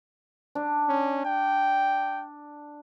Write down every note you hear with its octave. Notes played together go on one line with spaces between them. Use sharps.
D4
C#4
G5